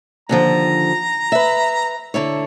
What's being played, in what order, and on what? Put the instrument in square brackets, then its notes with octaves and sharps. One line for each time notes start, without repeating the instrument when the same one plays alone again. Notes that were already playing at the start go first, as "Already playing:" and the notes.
[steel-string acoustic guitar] D#2 D3 F3 [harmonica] A#5
[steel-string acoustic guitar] B4 E5
D3 E4 C#5